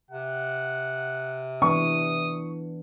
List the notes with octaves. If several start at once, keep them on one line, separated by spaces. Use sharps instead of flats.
C3 F#5
E3 B3 D4 C#6 D#6